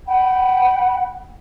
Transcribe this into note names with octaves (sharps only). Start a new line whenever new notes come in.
F#5 G5 B5